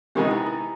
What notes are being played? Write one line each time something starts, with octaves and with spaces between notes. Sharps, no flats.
C3 D#3 G#3 B3 D#4 G4
E4
E4